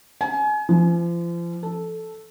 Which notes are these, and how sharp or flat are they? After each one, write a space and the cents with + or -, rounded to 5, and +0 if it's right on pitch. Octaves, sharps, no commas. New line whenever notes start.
G#5 +30
F3 -35
A4 -5